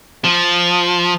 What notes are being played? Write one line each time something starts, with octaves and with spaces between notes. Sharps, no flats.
F3